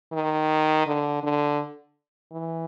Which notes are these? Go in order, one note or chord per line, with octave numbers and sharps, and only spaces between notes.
D#3
D3
D3
E3